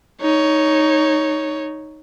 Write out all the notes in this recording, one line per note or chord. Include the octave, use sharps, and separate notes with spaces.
D#4 C#5